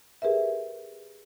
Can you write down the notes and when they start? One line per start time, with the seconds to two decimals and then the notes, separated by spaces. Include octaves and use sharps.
0.22 G4 G#4 A#4 B4 E5